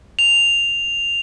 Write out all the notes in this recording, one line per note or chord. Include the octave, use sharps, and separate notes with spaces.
F7